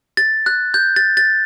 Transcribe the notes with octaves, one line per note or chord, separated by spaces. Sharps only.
A6
F#6
G6
A6
A6